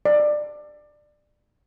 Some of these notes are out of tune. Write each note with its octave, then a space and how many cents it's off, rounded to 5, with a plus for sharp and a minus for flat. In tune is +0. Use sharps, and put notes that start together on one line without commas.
D5 +20